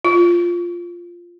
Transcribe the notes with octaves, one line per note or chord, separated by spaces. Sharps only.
F4